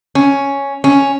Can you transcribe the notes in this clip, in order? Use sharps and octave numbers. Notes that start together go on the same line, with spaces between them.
C#4
C#4